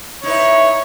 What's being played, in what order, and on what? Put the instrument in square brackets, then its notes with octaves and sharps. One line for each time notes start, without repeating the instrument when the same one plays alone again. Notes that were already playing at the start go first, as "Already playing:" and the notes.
[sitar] D#4 E4 B4 [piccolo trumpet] C#5